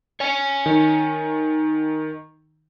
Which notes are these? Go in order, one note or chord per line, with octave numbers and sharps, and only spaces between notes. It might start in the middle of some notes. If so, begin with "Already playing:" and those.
C#5 G#5
D#3